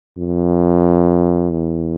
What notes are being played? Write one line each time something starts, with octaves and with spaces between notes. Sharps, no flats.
F2
E2